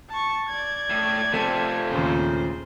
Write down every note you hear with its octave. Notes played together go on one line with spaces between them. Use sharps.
A5 C#6
D5 G#6
A2
C3 F3 A3 C4 A4
D#2 A#2 C#3 C5